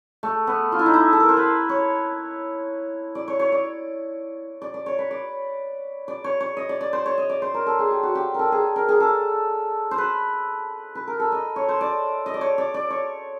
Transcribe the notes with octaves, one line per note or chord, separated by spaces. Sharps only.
A3
B3
F4
E4
D#4
E4
A4
A#4
C5
B4
C#5
D5
C#5
C#5
D5
D5
D5
C#5
B4
D5
D5
C#5
C#5
D#5
D5
D5
C5
C#5
D#5
D5
C5
A#4
A4
G#4
G4
F#4
G4
A4 A#4
G#4
A#4
G#4
A4
C5
B4
B4
A#4
A4
D#5
C#5
C5
D5
D#5
D5
C#5
D5
D5
C#5